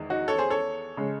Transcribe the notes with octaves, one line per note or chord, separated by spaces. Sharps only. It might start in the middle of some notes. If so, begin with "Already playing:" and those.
Already playing: E2 D#3 G#3
D#4 F#4
A4 C#5
G#4 C5
A4 C#5
C#3 G#3